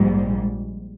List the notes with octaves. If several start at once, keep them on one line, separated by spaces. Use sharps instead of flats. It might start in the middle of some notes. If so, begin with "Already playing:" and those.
Already playing: A#1 G#2 G3